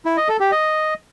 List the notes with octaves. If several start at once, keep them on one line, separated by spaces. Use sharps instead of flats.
E4
D#5
A4
G4
D#5